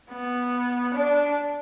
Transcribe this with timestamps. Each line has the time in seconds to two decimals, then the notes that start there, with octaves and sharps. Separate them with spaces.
0.12 B3
0.94 D4